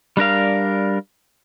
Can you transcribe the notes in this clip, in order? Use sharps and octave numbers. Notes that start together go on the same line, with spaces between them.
G3 D4 A#4 F5